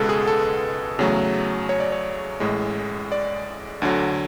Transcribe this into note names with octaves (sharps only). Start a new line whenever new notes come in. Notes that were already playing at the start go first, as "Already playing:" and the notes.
Already playing: C#2 B2 G#3 B3 A4 B4
G#4
A4
E2 C#3 F#3 A3
C#5
D5
C#5
A1 A2 G#3
D5
D2 D3 F#3